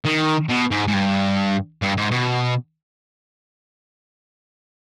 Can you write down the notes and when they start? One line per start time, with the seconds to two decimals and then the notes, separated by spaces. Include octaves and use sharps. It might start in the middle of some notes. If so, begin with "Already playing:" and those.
0.05 D#3
0.49 B2
0.71 G#2
0.88 G#2
0.94 G2
1.82 G2
1.97 G#2
2.11 B2